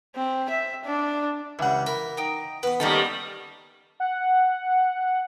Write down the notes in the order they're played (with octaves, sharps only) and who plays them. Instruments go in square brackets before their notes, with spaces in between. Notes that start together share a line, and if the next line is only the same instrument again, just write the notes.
[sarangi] C4
E5
D4
[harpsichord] C#2 G3 [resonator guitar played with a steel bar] E3 F#5
[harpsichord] A#4 [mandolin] B5
[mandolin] D#4 G5
[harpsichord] B3 [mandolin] B4 D#6
[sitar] D#3 G3 [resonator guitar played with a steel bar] A#3 A4 [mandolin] C#4 D#4 B5
[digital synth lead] F#5